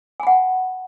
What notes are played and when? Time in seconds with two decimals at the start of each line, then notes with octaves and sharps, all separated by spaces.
0.20 G#5
0.23 B5
0.27 F#5